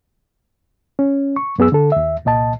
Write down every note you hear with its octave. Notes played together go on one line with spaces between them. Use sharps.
C#4
C#6
F#2 B3 G#4 E6
D3 A4
D#2 E5
C2 A#2 D#5 A5